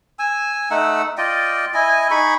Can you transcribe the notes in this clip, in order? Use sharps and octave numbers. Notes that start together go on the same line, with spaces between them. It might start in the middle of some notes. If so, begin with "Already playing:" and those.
G#5 E6
A3 D#4 F#5 E6
F4 D5 D#5 G5
E4 D#5 G#5
D#4 G#4 B5 C#6